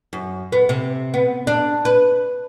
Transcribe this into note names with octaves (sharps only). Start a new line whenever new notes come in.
F#2
B3
C3
B3
D4
B4